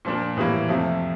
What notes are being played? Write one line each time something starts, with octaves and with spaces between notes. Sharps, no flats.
A#2 F3 A#3 D4
A2 E3 G3 A#3
F2 C3 F3 A3